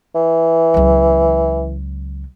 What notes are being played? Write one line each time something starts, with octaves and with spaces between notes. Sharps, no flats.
E3
C#2 F#3